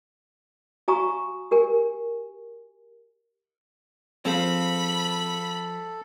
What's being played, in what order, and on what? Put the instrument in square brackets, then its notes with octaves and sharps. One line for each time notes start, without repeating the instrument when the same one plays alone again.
[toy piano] F#4 F5 G#5 A#5 C#6 D#6
G4 A#4 G#5
[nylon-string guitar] F3 G#4 F5 [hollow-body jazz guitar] C4 [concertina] A4 [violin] B5